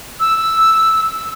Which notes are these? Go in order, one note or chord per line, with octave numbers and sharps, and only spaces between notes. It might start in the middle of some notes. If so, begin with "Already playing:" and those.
E6